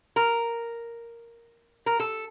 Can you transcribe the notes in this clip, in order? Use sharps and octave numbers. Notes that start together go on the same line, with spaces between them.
A#4
A#4
A4